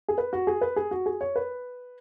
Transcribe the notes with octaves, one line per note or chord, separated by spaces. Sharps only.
G#4
B4
F#4
G#4
B4
G#4
F#4
G#4
C#5
B4